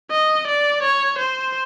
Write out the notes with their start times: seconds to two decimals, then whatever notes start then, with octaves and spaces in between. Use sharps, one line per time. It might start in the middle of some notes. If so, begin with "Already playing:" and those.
0.11 D#5
0.47 D5
0.83 C#5
1.18 C5